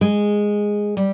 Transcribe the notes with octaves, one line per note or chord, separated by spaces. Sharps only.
G#3
G3